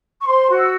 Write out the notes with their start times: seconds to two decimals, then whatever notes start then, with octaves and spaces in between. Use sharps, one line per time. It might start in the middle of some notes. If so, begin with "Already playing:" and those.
0.21 C#6
0.26 C5 C6
0.49 F#4
0.56 E6